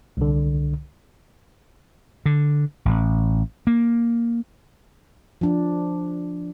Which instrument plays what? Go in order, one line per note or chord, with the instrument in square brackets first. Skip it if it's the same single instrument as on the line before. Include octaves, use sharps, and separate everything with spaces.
[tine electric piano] C2 D3
[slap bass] D3
A1
A#3
[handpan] F3 D4